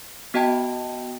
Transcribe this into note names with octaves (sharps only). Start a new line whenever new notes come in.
B3 F#4 D#5 G5 A5